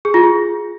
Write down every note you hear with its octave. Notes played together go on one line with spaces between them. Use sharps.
G#4
F4
G#4